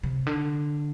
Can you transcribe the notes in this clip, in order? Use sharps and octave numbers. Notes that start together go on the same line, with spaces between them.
C3
D3